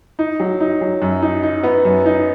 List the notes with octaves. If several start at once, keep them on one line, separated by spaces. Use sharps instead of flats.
D#4
F#3
D#4
F#3
F#2
D#4
D#4
B3
F#2
D#4